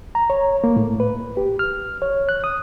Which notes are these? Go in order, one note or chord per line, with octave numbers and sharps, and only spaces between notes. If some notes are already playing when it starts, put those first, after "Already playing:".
A#5
C#5
A#3
A2
B4
G4
F6
C#5
F#6
D#6